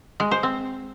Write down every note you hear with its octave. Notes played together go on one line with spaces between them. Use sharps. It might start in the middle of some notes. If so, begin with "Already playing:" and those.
G#3
C5
C4